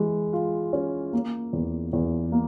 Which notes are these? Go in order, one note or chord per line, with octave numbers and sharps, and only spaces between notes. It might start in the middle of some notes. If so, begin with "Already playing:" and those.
Already playing: E3 G#3
F4
C#4
A#3
E2
E2
A#3